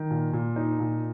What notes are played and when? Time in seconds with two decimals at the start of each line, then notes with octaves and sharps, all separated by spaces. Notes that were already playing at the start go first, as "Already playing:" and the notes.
Already playing: D#3
0.11 A#2
0.33 A#2
0.56 D#4
0.80 A#2